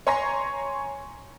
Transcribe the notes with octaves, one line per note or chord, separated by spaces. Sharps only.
C#5 G#5 A#5 C6 C#6 A#6